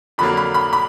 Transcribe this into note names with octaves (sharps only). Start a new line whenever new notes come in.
F2 D3 F#3 A#3 B5
B5
B5
B5